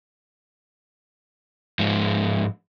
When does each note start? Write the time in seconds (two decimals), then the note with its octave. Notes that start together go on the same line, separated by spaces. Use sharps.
1.79 G#2 F3 G#3